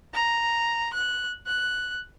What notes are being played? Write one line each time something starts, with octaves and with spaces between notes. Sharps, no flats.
A#5
F#6
F#6